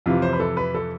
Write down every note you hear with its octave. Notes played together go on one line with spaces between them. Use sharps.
F2 C3 E3 F4
C5
B4
A4
B4
A4